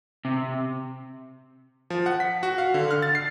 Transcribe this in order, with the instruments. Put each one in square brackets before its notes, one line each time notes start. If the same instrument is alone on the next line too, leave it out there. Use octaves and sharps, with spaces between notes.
[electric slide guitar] C3
[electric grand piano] F3
F#5
B6
F#4
F5
D3
F6
A6
C7